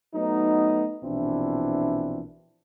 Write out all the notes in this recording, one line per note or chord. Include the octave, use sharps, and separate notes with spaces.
F#3 A3 B3 D#4
A#1 B2 E3 C4 D4 E4